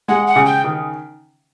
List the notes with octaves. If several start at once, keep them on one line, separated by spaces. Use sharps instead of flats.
G#3 F#5
F#5
C#3
G5
D#3